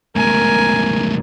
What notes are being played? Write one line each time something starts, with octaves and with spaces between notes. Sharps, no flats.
C#2 A2 A#4 G#5